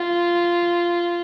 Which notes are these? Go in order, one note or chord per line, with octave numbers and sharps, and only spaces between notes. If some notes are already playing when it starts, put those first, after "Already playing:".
Already playing: F4